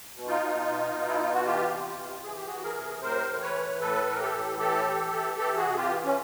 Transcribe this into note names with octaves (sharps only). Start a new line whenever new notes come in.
B2
D#4 F4
B2
B2
B2
E4
B2 F4
F#4
E3 F4 G4
C3
E3
E3 G#4
G4
E3 F#4 G#4
G#4 A#4
C3
A2 A#4 C5
E3
B4 C#5
A2
A2 A4 B4
E3 A#4
G4 A4
A2
E3 G4 A4
E3
E3
E3 G4 A4
F#4 G#4
C3
F4 G4
E3
C#4